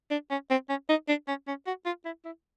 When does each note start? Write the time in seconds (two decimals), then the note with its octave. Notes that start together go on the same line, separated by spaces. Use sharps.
0.11 D4
0.31 C#4
0.50 C4
0.69 C#4
0.89 D#4
1.08 D4
1.28 C#4
1.48 C#4
1.67 F#4
1.86 F4
2.05 E4
2.25 E4